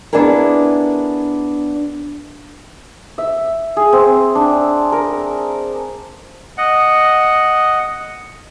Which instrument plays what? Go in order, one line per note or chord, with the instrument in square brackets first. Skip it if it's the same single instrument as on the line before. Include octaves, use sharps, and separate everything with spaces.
[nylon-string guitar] B3 D4 E4 G#4 A#4
[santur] E5
G#4
C4
D4
A#4
[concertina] D#5 F#5